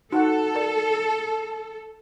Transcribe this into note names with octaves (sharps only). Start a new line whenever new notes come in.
D#4 F#4 A4 F#5 A5
A#4 D5